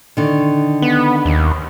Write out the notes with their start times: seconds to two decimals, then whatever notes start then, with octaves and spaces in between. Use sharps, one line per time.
0.17 D3 D#3
0.82 B3
1.26 D#2